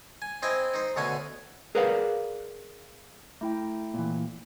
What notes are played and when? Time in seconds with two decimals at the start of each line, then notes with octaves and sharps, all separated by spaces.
0.22 G#5
0.42 C4 E4 D#5 G5 G#5
0.74 D#4 C5
0.96 D2 B2 D3 C#4 F#5 G#5
1.75 G#4 A#4 B4 D5 F5 F#5
3.41 A3 E4 G5
3.94 A#2 E3